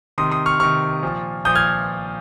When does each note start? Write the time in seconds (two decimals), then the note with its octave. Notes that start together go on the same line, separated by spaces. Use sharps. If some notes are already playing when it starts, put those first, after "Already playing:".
0.18 C3 D#3 C6 D#6
0.32 C6 D#6
0.46 C#6 F6
0.60 C3 D#3 C#6 F6
1.03 A#2 F3
1.45 A#2 F3 D#6 G6
1.55 F6 G#6